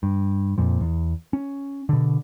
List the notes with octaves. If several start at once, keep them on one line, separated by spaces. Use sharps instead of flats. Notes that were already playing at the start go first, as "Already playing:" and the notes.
G2
F2 A#2 F3
E2
C#4
B2 D3